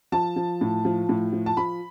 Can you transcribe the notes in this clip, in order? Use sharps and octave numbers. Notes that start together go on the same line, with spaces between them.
F3 A5
F3
A2
F3
A2
F3
A5
F3 B5